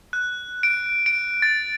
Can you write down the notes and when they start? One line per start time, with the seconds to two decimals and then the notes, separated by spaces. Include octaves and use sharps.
0.13 F#6
0.63 D7
1.06 D7
1.42 A6